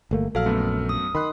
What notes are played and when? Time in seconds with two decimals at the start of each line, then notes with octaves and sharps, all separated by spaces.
0.11 G1 A3 A#3
0.35 A#1 F#3 A4 F5 F6
0.46 F#2 A3 B3
0.89 D#6
1.15 D#3 B5 C6 F#6